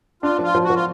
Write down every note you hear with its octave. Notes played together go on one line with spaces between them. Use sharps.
D4 F4
F3 F4
F3
F#4
F3 F4